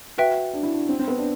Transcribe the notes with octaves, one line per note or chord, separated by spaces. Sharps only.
F#4 B4 E5 G5
D4
E4
D4
C4
C4
B3
D4